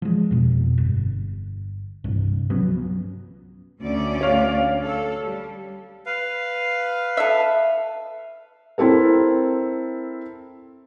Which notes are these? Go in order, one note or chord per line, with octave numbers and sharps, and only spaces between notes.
F3 G#3
F2 B2
G1
C2 G2
F3 F#3 B3 C#4
D2 C#4 D5
C#5 F5
A4
G3
B4 F5
A4 E5
C4 E4 A4 A#4